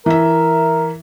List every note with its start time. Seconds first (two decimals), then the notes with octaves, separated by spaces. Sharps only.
0.06 E3 A#4 E5